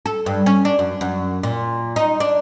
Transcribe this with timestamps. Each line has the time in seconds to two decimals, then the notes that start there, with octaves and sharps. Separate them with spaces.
0.06 A4
0.26 G2
0.46 C#4
0.65 D4
0.79 F#2
1.01 F#2
1.43 A#2
1.96 D#4
2.20 D4